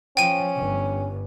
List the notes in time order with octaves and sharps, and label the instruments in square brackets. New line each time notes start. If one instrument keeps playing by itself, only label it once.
[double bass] F3 [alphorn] C#4 [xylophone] G5 D#7
[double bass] G1 G2